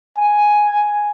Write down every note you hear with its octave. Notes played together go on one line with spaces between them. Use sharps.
G#5